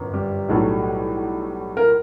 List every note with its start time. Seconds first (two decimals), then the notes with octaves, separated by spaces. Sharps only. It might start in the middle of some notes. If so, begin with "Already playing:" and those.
Already playing: G1 F#2
0.13 G3 G4
0.49 B1 A2 F#3 A3
1.77 A#4